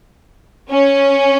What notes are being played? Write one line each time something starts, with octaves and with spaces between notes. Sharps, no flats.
C#4